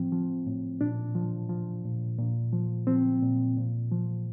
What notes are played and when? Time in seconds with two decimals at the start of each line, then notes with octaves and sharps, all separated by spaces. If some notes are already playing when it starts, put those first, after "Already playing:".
Already playing: A2 F3 C4
0.12 F3
0.47 A2
0.81 A#2 D4
1.15 F3
1.49 F3
1.85 A#2
2.19 A#2
2.53 F3
2.87 F3 C4
3.23 A#2
3.57 A#2
3.92 F3